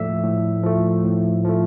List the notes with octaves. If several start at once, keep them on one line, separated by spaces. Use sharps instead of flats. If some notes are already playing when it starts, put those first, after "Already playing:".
Already playing: A2 F3 A3 D5 E5
A2
F3 A3
A2
F3 A3